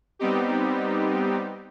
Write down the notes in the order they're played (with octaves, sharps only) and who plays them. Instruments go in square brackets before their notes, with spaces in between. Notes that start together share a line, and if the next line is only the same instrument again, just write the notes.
[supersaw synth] G3 B3 C4 D#4 G4